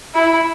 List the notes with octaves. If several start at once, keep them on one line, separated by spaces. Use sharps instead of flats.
E4